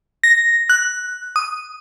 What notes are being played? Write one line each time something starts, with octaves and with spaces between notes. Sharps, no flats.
A#6
F#6
D#6